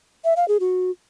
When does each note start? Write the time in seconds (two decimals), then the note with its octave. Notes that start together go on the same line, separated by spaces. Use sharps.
0.25 E5
0.36 F5
0.48 G#4
0.60 F#4